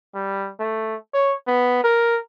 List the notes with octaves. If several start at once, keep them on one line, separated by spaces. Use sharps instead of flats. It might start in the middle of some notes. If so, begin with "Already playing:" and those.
G3
A3
C#5
B3
A#4